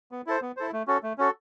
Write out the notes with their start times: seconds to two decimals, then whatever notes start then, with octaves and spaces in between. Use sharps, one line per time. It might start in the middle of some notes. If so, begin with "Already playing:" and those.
0.12 B3
0.27 E4 A4 C5
0.42 B3
0.57 E4 A4 C5
0.73 A3
0.87 C#4 F#4 A4
1.03 A3
1.18 C#4 F#4 A4